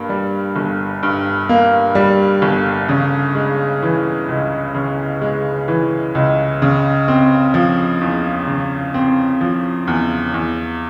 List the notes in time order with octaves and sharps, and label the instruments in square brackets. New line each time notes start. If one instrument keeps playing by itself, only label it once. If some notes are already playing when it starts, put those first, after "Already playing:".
Already playing: [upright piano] G2 A#3
G3
G1
G2
A#3
G3
G1
C#3
G#3
E3
C#2
C#3
G#3
E3
C#2
C#3
C4
F3
E2
C#3
C4
F3
E2
E2